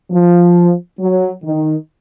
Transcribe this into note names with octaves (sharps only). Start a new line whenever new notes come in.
F3
F#3
D#3